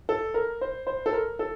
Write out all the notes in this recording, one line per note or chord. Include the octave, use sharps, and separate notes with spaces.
A4
A#4
C5
C5
A4
A#4
A4